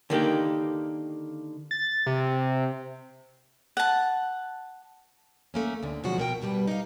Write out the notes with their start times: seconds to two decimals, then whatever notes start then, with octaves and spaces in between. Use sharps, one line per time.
0.10 D3 D#3 A#3 G4
1.71 A6
2.07 C3
3.77 F#5 A5
5.54 A3 A#3 C#4
5.83 D2 D3
6.04 B2 F3 F#3 G#3 F#4
6.18 B2 A#4 G5
6.41 G2 B2 G3 B4
6.68 D#4 F5